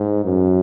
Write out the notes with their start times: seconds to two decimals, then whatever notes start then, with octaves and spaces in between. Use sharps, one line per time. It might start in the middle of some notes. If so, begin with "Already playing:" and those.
Already playing: G#2
0.25 F#2